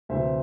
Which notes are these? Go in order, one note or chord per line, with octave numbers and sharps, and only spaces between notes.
D2 C3 E3 C5 E5